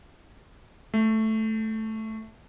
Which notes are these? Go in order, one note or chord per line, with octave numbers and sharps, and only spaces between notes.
A3